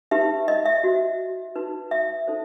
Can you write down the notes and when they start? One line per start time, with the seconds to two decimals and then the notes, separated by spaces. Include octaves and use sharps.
0.11 D#4 G4 B4 E5
0.48 D#5
0.66 E5
0.84 F#4 C5
1.56 D#4 F#4 B4
1.91 E5
2.28 D#4 A4 C5